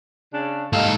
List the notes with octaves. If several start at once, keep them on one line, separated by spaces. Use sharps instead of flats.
C#3 D4
G#2 G3 D#4 A4 F5